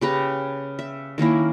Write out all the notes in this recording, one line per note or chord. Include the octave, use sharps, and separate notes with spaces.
C#3 G4 B4 A#5
E5
D#3 A#3 C#4 E4